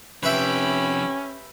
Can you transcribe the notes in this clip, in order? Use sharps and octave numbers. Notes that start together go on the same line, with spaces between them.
C3 F3 C#4 G4 B4 E5 G5 B5